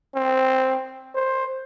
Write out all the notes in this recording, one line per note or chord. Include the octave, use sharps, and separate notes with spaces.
C4
C5